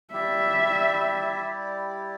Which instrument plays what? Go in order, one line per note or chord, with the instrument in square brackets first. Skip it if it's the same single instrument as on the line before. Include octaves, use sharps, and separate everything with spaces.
[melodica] G3 E4 G4 D5 [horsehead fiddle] E5